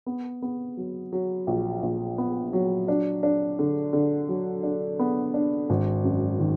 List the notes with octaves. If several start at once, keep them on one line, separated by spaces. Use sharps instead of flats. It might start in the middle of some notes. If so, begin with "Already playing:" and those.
B3
B3
F#3
F#3
A#1
A#1
B3
F#3
D4
D4
D3
D3
F#3
D4
B3
D4
G#1
F#2
D#3